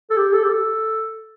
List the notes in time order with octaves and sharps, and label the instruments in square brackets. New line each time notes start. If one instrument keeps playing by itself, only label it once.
[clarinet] A4
G4
A4
G4
A4